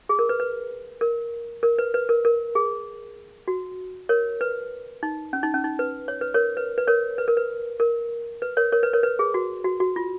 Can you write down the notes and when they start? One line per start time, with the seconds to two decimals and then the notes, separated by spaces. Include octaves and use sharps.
0.09 G#4
0.19 A#4
0.29 B4
0.40 B4
1.01 A#4
1.63 A#4
1.79 B4
1.94 B4
2.09 A#4
2.25 A#4
2.55 G#4
3.48 F#4
4.09 A#4 C#5
4.41 B4
5.03 D#4
5.33 C#4
5.43 D#4
5.54 C#4
5.64 D#4
5.79 B4
6.08 C#5
6.21 B4
6.34 A#4 C#5
6.57 B4
6.78 B4
6.87 A#4 C#5
7.18 B4
7.28 A#4
7.37 B4
7.80 A#4
8.42 B4
8.57 A#4 C#5
8.72 A#4 C#5
8.83 B4
8.93 A#4 C#5
9.03 B4
9.19 G#4
9.34 F#4
9.64 F#4
9.80 F#4
9.96 F4